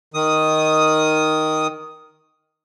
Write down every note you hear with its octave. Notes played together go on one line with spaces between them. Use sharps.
D#3 D#6